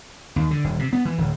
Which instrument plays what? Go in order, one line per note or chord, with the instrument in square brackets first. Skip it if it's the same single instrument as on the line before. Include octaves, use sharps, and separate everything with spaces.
[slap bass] D#2
D3
D#1
C3
B3
E3
D1